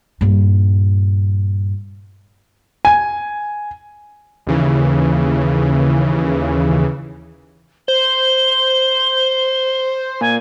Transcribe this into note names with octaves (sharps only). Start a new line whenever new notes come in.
G2 A#2
G#5
D#2 C#3 E3
C5 G7
A#2 G#5